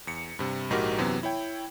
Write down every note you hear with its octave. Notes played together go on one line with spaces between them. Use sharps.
E2 C#7
G2 C3
A#1 G#2 D#4 F#4 G4 A#4
F#2 C3 E3 F#3 B3
E4 C#5 G5